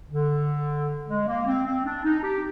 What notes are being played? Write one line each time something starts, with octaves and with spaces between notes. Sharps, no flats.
D3
G#3
A#3
C4
C4
D4
D#4
G4